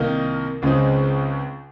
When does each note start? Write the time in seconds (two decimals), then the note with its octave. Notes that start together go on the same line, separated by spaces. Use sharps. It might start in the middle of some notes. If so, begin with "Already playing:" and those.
Already playing: C2 C3 D#3 A#3 D#4
0.62 C#2 C#3 G#3 C4 D#4